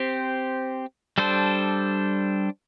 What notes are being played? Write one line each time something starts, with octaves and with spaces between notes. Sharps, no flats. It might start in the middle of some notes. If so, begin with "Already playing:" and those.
Already playing: C4 G4 C5
G3 D4 A4 C5